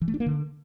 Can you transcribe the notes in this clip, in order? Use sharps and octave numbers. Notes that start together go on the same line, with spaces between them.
E3
A3
D4
A#3
D3